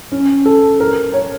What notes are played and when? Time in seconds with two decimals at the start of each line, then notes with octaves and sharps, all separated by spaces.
0.12 C#4
0.45 A4
0.80 A#4
1.13 C#5